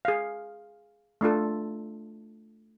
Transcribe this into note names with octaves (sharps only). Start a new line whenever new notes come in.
G#4 F5
A3 D4 F4 A4